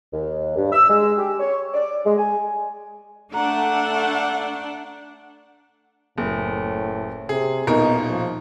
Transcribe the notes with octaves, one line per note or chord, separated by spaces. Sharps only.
D#2
G2
E6
G#3
G4
C#5
D5
G#3
G#5
A3 D4 F#5 A#5
F#1 A2
C3 G#4
D#1 B2 D#4 A#4
F3